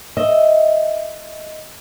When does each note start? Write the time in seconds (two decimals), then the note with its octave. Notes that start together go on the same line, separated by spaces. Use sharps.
0.17 D#5 E5